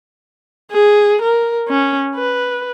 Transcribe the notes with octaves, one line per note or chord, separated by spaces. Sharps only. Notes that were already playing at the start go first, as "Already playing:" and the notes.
G#4
A#4
C#4
B4